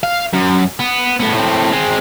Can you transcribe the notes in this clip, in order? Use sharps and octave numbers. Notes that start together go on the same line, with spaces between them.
F5
F#2
B3
A2 B3
A2 C4
G#3 C4